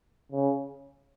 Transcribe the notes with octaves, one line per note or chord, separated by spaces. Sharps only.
C#3